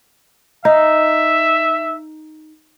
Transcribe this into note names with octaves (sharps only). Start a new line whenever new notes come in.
D#4 E5